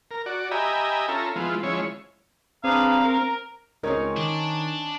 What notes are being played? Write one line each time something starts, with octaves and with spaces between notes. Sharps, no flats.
A#4
F#4 D5
G4 D#5 E5 G#5 A#5 B5
C#4 F4 A4 E5 A#5
F3 G#3 B3 E4 F4
F3 G#3 C#4 E4 C#5
C4 D4 G#4 B4 F5 A#5
A#4
C#2 C4 C#4 D#4 A#4 C#5
D#3 D4